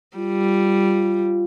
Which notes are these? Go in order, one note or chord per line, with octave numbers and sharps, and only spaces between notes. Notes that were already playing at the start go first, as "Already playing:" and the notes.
G3 F4